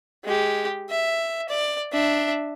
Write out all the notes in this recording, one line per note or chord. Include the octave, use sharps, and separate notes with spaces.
G#3 G4
E5
D5
D4 E5